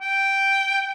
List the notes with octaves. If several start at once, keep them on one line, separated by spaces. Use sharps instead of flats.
G5